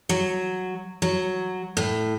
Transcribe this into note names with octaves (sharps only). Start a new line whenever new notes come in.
F#3
F#3
A2